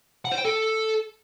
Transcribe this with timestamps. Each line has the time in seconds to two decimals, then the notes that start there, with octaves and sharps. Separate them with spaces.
0.25 F#5
0.31 C5
0.38 G5
0.44 A4